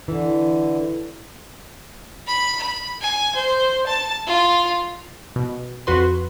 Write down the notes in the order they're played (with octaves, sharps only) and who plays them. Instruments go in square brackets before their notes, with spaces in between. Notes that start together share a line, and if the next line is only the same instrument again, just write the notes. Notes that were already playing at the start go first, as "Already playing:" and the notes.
[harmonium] D3 [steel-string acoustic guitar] E3
[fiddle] B5
B5
G#5
C5
A5
F4
[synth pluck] B2
F2 F#4 B4 C6